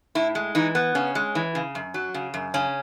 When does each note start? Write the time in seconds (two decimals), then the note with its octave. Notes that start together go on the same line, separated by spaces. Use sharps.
0.15 A2 E4
0.35 G#3
0.55 E3 D#4
0.75 B3
0.95 C#3 C#4
1.15 G#3
1.35 E3
1.55 C#3
1.75 F#2
1.94 F#3
2.14 C#3
2.34 F#2
2.54 C#3 C#4